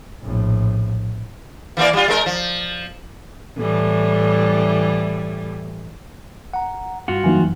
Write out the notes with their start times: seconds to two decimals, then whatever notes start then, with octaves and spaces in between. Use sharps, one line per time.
0.22 A#1 A2
1.77 E3 A#3 D5
1.93 G3 F4
2.08 G#3 A#4
2.26 F3
3.57 A2 E3 G3
6.54 F#5 A#5
7.08 G2 F4 F#4 C#7
7.24 F2 E3 F#3 A#3 D#4 G#5